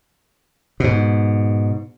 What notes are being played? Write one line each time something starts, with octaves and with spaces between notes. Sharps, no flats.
G#2 B2